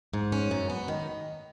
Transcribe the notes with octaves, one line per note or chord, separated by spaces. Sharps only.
G#2
C#4
F#2
B3
D#3